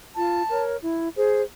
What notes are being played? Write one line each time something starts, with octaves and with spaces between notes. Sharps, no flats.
F4 A5
A#4 C#5
E4
G#4 C5